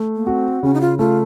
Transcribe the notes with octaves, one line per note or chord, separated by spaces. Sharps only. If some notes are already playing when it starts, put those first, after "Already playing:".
Already playing: A3
A#3
C4 F#4
C#3 C#4
D#4
F4
A3 F4